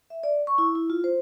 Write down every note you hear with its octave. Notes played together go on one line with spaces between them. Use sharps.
E5
D5
C#6
E4
E4
F4
C5